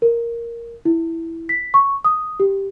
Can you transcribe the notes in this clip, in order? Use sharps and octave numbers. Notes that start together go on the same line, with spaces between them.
A#4
E4
B6
C#6
D#6
G4